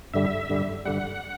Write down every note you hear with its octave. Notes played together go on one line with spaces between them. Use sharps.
G2 D3 G3 E5
G2 D3 G3
G2 D3 G3 F#5